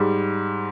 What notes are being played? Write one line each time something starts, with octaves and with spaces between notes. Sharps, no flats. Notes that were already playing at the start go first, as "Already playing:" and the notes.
Already playing: G#2 G3